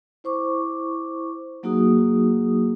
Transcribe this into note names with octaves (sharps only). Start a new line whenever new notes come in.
E4 C5 C#6 D6
F#3 A#3 D#4 F#4 G#4 D#6